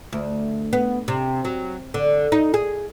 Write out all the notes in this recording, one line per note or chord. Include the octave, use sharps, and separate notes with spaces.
D2
B3
C3
F#3
D3
D#4
G#4